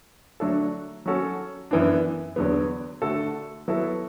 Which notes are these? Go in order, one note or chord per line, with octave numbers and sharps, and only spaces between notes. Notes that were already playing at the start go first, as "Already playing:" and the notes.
D3 F#3 A3 D4 A4
F#3 C#4 F#4 A4
F#2 E3 B3 D4
E2 D3 F#3 B3
D3 A3 D4 F#4 A4
F#3 B3 E4 A4